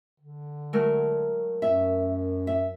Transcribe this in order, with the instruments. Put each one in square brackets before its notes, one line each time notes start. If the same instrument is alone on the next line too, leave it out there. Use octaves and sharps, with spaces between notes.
[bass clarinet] D3
[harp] F#3 A3 A#4
[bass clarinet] F#2 [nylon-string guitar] E5
[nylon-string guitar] E5